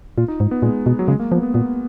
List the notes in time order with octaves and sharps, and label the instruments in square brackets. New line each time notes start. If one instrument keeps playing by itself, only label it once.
[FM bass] A#2 [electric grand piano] F4
[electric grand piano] D#4
[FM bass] G#2
[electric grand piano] B3
[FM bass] A#2 [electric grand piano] G#3
[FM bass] B2
[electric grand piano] F#3
[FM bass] C#3 [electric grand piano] G#3
[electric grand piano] A#3
[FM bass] F3 [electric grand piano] B3
[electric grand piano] B3
[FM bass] A#2 [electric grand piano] B3